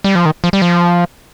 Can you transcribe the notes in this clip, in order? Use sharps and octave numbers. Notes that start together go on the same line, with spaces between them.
G3
F3
D#3
F3
G3
F3